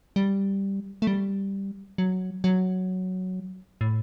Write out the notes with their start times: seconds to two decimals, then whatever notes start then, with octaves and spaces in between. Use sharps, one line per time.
0.16 G3
1.02 A3
1.07 G3
1.98 F#3
2.44 F#3
3.81 A2